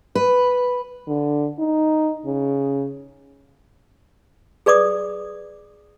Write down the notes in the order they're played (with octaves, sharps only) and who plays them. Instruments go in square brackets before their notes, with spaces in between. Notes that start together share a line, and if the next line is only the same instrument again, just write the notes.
[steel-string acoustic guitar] B4
[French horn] D3
D#4
C#3
[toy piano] G#4 B4 D5 D6 D#6